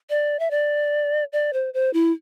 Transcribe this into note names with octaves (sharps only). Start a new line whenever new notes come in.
D5
E5
D5
D5
C5
C5
E4